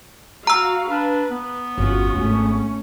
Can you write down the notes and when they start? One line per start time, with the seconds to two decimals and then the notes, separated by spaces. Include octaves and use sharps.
0.47 F#4 F5 A#5 E6
0.89 D4 B4
1.31 B3
1.78 G1 E2 C#4 F4 F#4
2.16 G#1 A3 C#4